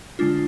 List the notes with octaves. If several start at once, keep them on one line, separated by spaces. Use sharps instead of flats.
D3 G#3 D4 F4